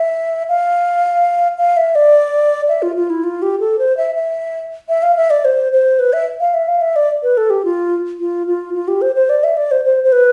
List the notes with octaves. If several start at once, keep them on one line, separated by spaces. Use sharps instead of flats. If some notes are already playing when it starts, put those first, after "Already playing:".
Already playing: E5
F5
F5
E5
D5
E5
F4
F4
E4
F4
G4
A4
C5
E5
E5
E5
F5
E5
D5
C5
C5
B4
E5
F5
E5
F5
E5
D5
B4
A4
G4
F4
F4
F4
F4
G4
C5
C5
D5
E5
D5
C5
C5
C5
B4